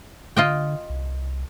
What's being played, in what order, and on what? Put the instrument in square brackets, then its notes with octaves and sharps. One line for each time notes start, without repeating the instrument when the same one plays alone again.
[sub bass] D3 [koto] F4 D#5 G5
[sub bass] C2